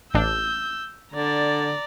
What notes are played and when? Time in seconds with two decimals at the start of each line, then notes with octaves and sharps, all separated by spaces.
0.14 A1 D4 E6 G6
1.13 D3 D5 A#5